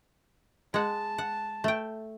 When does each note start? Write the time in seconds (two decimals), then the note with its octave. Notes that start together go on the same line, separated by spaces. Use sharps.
0.74 G#3 F#5 A5
1.18 F#5
1.64 A3 G5